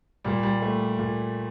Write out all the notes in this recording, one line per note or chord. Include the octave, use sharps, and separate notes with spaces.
A#2 G3
G3
A3
A#2